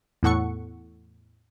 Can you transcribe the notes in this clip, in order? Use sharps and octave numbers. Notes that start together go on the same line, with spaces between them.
E2 A2 A4 F#5 C#6 C#7